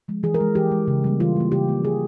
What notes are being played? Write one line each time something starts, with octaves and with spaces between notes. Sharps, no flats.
F3 G#3
E3 G#4
A#4
G#3
E3 G4
G#3
C#3
G3 A#3
E3 F4
G3 A#3
C#3 G4
F3 A#3
E3 G#4